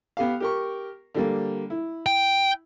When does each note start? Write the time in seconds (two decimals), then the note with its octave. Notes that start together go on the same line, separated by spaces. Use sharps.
0.17 B3 G4 F5
0.40 G4 A#4 C#6
1.15 D3 G3 A#3
1.70 E4
2.06 G5